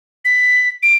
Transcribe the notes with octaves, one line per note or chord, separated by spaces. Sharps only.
B6
D7